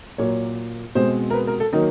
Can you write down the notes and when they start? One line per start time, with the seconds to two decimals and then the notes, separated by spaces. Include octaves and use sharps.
0.18 A#2 F#3 A#3 C#5
0.95 B2 G#3 C4 C5
1.30 A#4
1.34 B4
1.47 A#4
1.60 A4
1.73 D#3 F#3 A#3 D#4